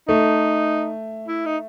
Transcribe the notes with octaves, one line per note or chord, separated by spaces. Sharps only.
A3 D#4
E4
D#4